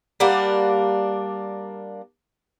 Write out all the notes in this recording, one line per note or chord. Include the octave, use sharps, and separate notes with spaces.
G3 A#3 D4 F#5